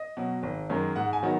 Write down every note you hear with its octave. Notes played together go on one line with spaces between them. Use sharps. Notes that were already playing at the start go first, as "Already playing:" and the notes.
Already playing: D#5
B2 F#3
G#1
F#2 D#3 G#3
G#2 F#5
G#5
D#3 F#3 B3 D#4